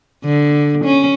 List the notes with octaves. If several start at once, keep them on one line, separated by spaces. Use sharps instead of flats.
D3
C#4